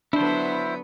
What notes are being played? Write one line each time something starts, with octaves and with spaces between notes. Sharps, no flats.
D3 F#3 B3 D4 E4 C5